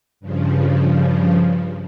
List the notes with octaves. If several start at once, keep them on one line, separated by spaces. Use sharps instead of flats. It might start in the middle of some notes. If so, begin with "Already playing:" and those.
G2 C#3 F3